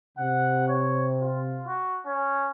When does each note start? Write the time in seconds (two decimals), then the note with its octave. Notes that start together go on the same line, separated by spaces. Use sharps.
0.18 C3 F#5
0.68 C#5
1.22 F4
1.67 F#4
2.06 C#4